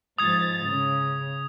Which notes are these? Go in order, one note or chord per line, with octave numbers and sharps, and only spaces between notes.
G#2 F3 D#6 G#6 A6
C#3